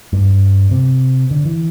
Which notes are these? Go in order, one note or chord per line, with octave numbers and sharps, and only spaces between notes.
G2
C3
D3
E3